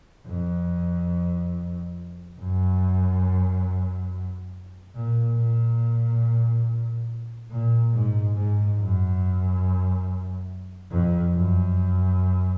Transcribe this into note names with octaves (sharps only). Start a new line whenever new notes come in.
F2
F#2
A#2
A#2
A#2
G#2
G#2
F#2
F2
F#2